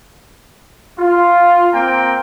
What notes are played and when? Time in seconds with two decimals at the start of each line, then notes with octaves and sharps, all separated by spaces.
0.99 F4
1.73 A#3 C4 G5 A#5